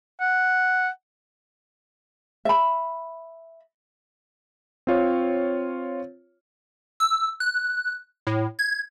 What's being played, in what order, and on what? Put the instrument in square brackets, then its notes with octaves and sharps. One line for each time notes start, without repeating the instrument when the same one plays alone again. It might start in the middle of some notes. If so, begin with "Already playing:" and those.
[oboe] F#5
[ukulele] E5 B5
[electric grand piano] C4 F4 C#5
[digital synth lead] E6
F#6
A2
G#6